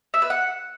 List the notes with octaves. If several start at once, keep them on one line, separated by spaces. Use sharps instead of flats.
E5
B4
F#5